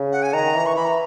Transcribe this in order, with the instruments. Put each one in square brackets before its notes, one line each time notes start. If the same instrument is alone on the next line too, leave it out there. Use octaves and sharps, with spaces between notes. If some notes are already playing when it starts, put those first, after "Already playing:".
Already playing: [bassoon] C#3
[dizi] F#5
G#5
[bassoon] D#3 [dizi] A#5
[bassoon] E3
[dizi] C#6
[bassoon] E3 [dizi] B5
[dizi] A#5